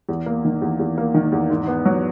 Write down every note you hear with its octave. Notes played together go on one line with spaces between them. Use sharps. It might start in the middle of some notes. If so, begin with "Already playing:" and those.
E2
A#3
D#3
E2
E2
A#3
D#3
E2
G#2
B3
F#3